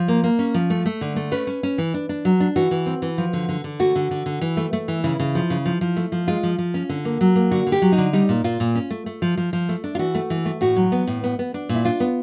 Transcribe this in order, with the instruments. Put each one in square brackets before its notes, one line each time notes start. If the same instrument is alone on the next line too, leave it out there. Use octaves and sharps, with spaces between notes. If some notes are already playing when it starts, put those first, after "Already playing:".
Already playing: [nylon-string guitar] F3
A#3
A#3
C#4
F3
A3
A3
D3
A3
C#4 B4
C#4
C#4
E3
D4
D4
F#3
D4
E3 F#4
E3
C4
E3
F3
D3
D3
D3
A3 F#4
D3
D3
D3
E3
A3
A3
E3
C#3 E4
C#3
F3
C#3
F3
F3
A3
F3
G#3 F4
F3
F3
C#4
D3
A#3
F#3
A#3
D3 F#4
D3
G4
F#3
D#4
D3
G3 D#4
A#2
A#2 F4
A#2
C#4
A3
A3
F3
F3
F3
A3
D4
F4
E3 F#4
A3
E3
A3
A2 F#4
F#3
B3
A2
B3
B3
D4
A#2
E4
D4 F4
B3